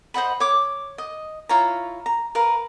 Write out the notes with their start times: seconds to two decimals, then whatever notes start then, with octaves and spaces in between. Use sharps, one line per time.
0.14 C5 D#5 F#5 B5
0.40 C#5 D6
0.98 D#5
1.49 E4 F4 C#5 A#5
2.06 A#5
2.35 A#4 B4 F5